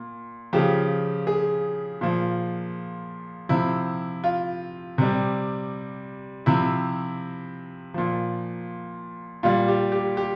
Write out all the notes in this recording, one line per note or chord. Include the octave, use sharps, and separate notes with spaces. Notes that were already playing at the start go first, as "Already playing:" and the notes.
Already playing: A#2
C#3 F3 G4
G#4
A#2 F3
C3 F3 E4
F4
C3 G3
C3 F3 E4
A#2 F3
A#2 G3 F4
G4
G4
G4